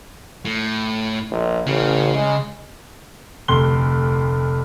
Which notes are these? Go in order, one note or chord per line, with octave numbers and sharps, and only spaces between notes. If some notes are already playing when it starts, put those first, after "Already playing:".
A2
A#1
A1 C#3
G#3
F1 D2 C6 F#6 G7